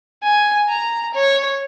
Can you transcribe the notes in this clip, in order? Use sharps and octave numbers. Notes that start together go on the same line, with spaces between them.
G#5
A#5
C#5